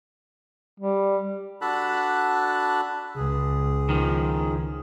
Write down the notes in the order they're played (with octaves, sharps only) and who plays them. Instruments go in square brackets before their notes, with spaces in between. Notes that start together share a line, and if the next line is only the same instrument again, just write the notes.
[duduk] G3
[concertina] D4 F#4 A4 A5 B5 F#6
[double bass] C#2 [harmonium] G#4
[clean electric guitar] D#3 F3